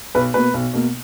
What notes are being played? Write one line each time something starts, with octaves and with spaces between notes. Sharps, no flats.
B1 B4
B2 A#3 B4
B1
B2 A#3